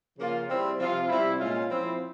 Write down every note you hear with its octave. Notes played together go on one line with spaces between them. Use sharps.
C#3 F3 A#3 C#4 F4
G3 C4 E4
C3 F3 C4 F4
C3 G3 C4 E4
A#2 G#3 C#4 F4
F3 C4 E4